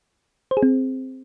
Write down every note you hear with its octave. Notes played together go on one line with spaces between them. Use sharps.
C5
G#4
C4